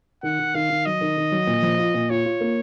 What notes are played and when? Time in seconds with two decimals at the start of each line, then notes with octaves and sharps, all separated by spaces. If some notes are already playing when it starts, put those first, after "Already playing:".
0.23 D#3 F#5
0.39 D#3
0.54 D#3 F5
0.69 D#3
0.85 F#3 D#5
1.01 D#3
1.17 D#3
1.32 F#3
1.47 A#2
1.62 F3
1.78 F4
1.94 A#2
2.10 F4 C#5
2.25 F4
2.41 A#3